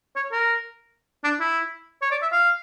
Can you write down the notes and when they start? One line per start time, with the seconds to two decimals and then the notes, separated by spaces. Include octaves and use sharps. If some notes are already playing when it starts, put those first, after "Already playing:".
0.16 C#5
0.32 A#4
1.24 D4
1.40 E4
2.02 C#5
2.11 D5
2.22 E5
2.32 F5